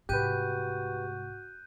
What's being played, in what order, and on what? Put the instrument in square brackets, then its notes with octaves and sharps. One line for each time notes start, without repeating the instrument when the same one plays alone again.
[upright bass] C2 G#2 [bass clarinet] F#4 [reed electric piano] G4 B4 [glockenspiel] F#6 G6 D#7